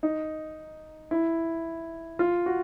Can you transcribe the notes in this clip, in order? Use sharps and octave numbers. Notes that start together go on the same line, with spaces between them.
D#4
E4
F4
F#4